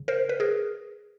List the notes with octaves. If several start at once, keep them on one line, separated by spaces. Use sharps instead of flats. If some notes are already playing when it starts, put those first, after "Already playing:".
Already playing: C#3
A#4 C5
B4
G#4 A#4